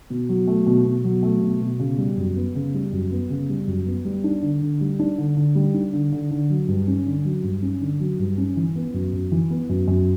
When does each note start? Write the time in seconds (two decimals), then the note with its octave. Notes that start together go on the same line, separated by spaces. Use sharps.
0.10 B2
0.29 F#3
0.47 A3
0.67 B2
0.86 B2
1.04 F#3
1.23 A3
1.42 B2
1.61 B2
1.79 C#3
1.98 G3
2.17 F#2
2.36 B3
2.55 C#3
2.74 G3
2.92 F#2
3.11 B3
3.30 C#3
3.49 G3
3.67 F#2
3.86 B3
4.05 G3
4.24 D4
4.42 D3
4.62 D3
4.81 G3
4.99 D4
5.18 D3
5.37 D3
5.55 G3
5.74 D4
5.93 D3
6.12 D3
6.31 D3
6.50 F#3
6.68 G2
6.87 C#4
7.06 D3
7.25 F#3
7.44 G2
7.62 C#4
7.81 D3
8.00 F#3
8.19 G2
8.38 C#4
8.57 E3
8.76 B3
8.94 F#2
9.13 F#2
9.32 E3
9.50 B3
9.69 F#2
9.88 F#2